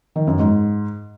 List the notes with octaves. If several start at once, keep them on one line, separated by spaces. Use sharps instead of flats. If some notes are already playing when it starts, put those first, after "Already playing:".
D#3
F#2
G#2